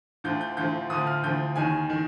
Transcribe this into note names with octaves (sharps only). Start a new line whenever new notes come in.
D2 D3 F3 G6
G6
D2 D3 F3 G6
D2 D3 F3 D#6
F6
D2 D3 F3 G6
D#2 D#3 G#5
D#3